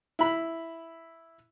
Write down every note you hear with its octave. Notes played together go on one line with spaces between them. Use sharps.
E4 B5